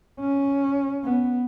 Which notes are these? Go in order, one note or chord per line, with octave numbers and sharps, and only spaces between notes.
C#4
B3